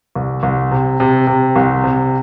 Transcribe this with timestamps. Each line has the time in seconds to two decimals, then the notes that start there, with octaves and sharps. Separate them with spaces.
0.15 C2
0.43 C2
0.71 C3
1.00 C3
1.27 C3
1.56 C2
1.84 C3